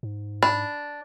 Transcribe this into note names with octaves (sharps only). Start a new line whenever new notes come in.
G#2
D4 B5